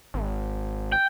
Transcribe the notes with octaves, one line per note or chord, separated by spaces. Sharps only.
G#1
G5